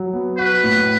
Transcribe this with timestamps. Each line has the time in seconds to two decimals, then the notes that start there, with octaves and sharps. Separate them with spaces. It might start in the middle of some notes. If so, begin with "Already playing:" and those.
Already playing: F#3
0.13 B3
0.38 F#4 B4
0.64 A2